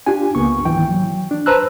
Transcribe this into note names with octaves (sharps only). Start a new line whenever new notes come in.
D4 F4 G4 G#5
C#2 A#3 B3 C#6
G#2 D#3 E3 G5
F#3
D4
B4 C5 A5 A#5 E6 F#6